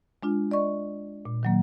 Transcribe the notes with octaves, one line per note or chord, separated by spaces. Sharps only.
G#3 D4 F4
D5 D#5 C#6
A#2
D#3 F#3 A#3